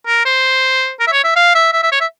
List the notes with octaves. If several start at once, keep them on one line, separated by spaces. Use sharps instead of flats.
A#4
C5
A#4
E5
C#5
E5
F5
E5
E5
E5
C#5
E5